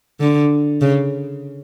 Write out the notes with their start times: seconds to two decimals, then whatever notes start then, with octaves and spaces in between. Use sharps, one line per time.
0.20 D3
0.81 C#3